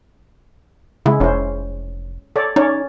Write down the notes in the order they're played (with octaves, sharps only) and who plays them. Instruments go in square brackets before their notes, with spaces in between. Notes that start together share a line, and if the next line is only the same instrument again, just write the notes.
[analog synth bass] C#3 [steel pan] G#3 E4
[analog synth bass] F1 [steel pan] C#4 E4 C5
[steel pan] A4 C#5 D5
[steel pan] C#4 C#5 D5 [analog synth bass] D#4